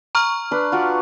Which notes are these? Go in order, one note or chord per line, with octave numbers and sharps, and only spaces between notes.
A#5 C#6 F6
D4 B4 B5
F4 F#4 D5